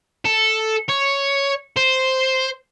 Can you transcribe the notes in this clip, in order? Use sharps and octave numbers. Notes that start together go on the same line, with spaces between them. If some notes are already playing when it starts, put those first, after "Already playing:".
A4
C#5
C5